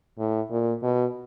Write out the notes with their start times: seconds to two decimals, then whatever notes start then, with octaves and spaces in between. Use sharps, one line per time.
0.18 A2
0.51 A#2
0.83 B2